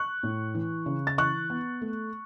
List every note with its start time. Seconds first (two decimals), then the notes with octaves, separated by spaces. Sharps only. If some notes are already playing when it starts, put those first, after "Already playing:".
Already playing: C#6 F#6
0.23 A2
0.55 E3
0.86 C#3
1.07 A6
1.18 E3 C#6 F#6
1.50 B3
1.82 A3